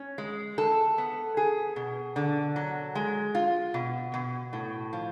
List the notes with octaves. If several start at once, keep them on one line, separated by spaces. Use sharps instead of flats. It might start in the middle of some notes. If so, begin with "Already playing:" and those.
Already playing: C#4
G#3
A4
B3
G#4
B2
D3
F#3
G#3
F4
B2
B2
A2
F3